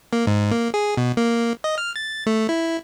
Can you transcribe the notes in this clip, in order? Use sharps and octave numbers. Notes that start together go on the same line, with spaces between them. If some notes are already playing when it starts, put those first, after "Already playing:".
A#3
G#2
A#3
G#4
B2
A#3
D#5
F6
A6
A3
E4